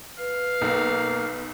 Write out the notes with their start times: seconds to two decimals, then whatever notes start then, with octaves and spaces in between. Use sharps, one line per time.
0.18 B4 F5
0.61 B1 A#3